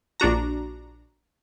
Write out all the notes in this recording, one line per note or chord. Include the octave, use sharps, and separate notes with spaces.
A#1 D4 F#4 A#5